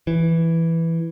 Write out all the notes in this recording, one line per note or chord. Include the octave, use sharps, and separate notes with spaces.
E3